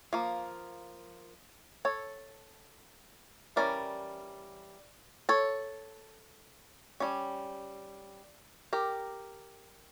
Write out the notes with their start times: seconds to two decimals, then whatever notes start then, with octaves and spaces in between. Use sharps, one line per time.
0.13 F3 A#3
1.85 A4 C#5
3.56 E3 G3 C#4 A#4 D5
5.29 A4 C#5
7.00 G3 C#4
8.73 G4 A#4